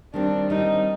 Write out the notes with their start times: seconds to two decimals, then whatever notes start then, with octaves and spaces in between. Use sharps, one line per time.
0.14 D#3 G3 C4 D4
0.50 D#3 G3 C4 D#4